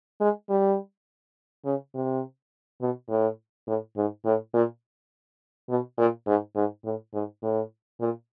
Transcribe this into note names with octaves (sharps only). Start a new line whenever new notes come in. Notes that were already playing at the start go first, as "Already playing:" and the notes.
G#3
G3
C#3
C3
B2
A2
A2
G#2
A2
A#2
B2
A#2
G#2
G#2
A2
G#2
A2
A#2